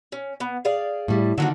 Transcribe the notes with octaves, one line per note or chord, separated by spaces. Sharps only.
C#4
B3
G#4 D5 F5
A2 G3
D3 D#3 F#3 A#3 F#4